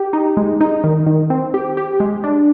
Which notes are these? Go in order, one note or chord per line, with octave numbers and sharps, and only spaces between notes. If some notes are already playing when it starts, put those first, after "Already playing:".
Already playing: G4
D#4
G#3
D#4
D#3
D#3
C4
G4
G4
G#3
D4